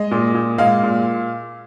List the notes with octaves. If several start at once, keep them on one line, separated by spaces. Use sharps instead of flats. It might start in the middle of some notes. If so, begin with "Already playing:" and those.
Already playing: G#3 D#5
A#2
A#2
G#3 F5
A#2